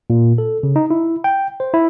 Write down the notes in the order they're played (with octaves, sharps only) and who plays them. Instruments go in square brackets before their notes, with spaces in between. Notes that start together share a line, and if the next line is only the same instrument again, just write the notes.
[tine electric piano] A#2
A4
C#3
D#4
E4
G5
C5
E4